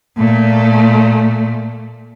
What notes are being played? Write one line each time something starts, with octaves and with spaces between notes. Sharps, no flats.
A#2 A3